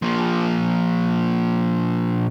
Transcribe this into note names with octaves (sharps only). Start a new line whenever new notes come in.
A#2 F3